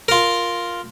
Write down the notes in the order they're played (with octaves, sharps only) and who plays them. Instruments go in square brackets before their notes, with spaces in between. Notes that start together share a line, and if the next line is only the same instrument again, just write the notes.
[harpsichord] F4 A#4